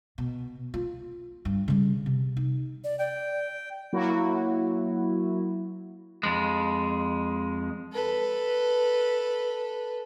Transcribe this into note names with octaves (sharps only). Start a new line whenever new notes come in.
B2
F4
G2
C#3 G3
C3
D#4
D5
D5 G5
F#3 A#3 E4 F#4
F2 G#3
A4 B4